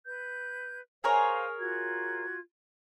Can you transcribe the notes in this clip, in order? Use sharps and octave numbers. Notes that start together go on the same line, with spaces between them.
B4 G6
G#4 A#4 C5 C#5 F5 G#5
F4 F#4 G#6